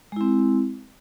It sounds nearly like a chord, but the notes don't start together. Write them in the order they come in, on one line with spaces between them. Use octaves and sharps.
G#3 E4 C4